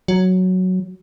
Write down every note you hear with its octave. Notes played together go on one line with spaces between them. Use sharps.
F#3